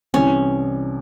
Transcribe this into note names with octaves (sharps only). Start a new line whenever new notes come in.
C2 C3 E3 C#4